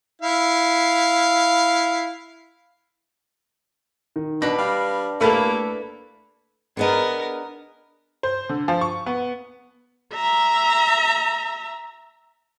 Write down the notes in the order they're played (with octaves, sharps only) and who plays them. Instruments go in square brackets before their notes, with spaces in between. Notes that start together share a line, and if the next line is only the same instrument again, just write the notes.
[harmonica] E4 F5
[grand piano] D#3
[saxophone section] B2 [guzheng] D4 B4 [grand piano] A#6
[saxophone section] G3 F5
[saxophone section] G3 A#3 [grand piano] A3 A4 [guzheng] E4 B4 A5
[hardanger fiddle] B3 A#4 [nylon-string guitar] D4 G#4 D#5
[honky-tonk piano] C5
D3
F3
C#6
B3
[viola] E5 A#5